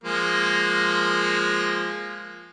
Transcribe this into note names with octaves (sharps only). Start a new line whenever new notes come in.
F3 G#3 A#3